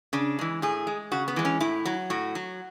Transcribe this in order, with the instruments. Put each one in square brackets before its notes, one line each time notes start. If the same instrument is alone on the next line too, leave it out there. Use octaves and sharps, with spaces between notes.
[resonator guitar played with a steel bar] C#3 D4
E3 G#3
A2 G#4
G#3
C#3 F#4
B3
E3 G#3
C#4
A2 E4
F#3
A2 F#4
F#3